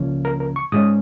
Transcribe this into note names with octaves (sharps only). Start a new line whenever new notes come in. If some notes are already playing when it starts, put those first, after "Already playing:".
Already playing: C#2 C#3 F3 A#3 C#4
A#4
A#4
C#6
G#2 G#3 C#4 D#6